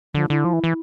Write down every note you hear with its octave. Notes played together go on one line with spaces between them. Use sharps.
D3 F3
D3 E4
F3
E3
E3